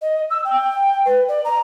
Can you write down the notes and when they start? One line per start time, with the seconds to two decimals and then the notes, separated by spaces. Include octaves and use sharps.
0.01 D#5
0.30 E6
0.44 G5
1.05 B4
1.28 D5
1.44 A#5